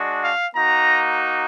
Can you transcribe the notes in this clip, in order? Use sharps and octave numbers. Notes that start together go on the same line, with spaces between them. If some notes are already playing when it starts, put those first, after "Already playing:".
Already playing: G#3 D4 F#4
F5
A#3 D#4 F#4 A#5